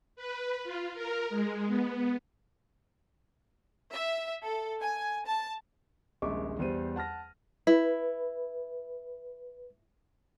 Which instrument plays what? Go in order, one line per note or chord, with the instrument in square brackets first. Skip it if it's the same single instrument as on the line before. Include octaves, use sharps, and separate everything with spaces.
[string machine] B4
F4
A#4
G#3
B3
[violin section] E5
A4
G#5
A5
[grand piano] D#1 A#1 G#3 E5 C#6 D6
E2 G3 C5 D#7
F#5 A5 F6 A#6
[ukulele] E4 [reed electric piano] B4